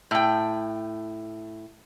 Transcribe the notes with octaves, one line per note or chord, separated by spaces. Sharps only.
A2 G5